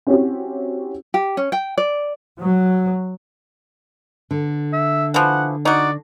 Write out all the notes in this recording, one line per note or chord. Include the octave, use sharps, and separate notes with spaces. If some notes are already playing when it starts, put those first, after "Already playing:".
C4 C#4 E4 F#4 G4 C#5
G4
C#4
G5
D5
F#3
D3
E5
E3 F3 F#5
D#4 F#4 D5